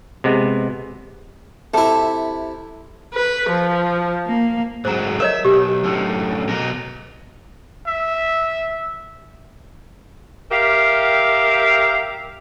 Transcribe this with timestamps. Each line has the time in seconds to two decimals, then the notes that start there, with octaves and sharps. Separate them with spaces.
0.24 C3 G#3 B3
1.74 C3 E4 A4
3.12 B4
3.48 F3
4.26 A#3
4.85 G#2 F#3 C5 A#5
5.20 A#4 C#5 D#5 E5
5.45 B1 G4
5.84 F#2 A2
6.49 B2 A#4
7.87 E5
10.51 G4 A#4 E5 F5